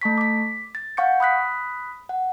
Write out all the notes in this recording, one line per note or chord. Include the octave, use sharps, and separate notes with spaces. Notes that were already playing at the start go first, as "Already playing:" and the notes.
A3 A5 C#6 B6
D6 B6
A6
F5 F#5 C#6 G6 C#7
B5 D#6 F#6 B6
F#5